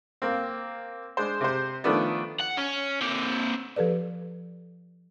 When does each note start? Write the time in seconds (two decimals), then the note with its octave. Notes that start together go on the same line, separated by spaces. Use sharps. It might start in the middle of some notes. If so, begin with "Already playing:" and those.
0.22 A#3 C4
1.17 G#3 D4 C5
1.41 C3 C5
1.84 D#3 F3 A3 B3 D4
2.40 F#5
2.57 C#4
3.01 A#3 C4
3.76 F3 G4 A4 B4 D5